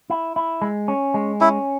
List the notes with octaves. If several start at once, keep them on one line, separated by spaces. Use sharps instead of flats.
E4
E4
G#3
C#4
G#3
C#4 E4